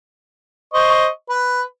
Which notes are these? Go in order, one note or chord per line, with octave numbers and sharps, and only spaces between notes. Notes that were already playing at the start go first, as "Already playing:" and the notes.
C5 D#5 C#6
B4